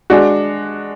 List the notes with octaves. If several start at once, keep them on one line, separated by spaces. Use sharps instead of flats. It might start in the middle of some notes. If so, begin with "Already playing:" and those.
G#3 D4 F#4